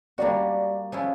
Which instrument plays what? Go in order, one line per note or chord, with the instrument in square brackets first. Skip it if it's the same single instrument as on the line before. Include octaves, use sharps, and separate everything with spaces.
[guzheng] G3 A#3 D4 F#4 [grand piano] D5
[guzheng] F3 G#3 C#4 E4